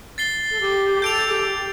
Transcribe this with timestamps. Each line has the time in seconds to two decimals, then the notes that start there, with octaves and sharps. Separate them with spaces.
0.18 A6 C7 G7
0.51 A4
0.61 G4
1.02 A4 G6 D7 F7
1.30 G4